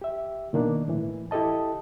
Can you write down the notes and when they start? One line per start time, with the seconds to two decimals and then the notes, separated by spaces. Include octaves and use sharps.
0.02 G4 E5
0.53 B2 D#3 A#3 D4
0.88 A2 E3
1.31 E4 G4 A4 D#5 A5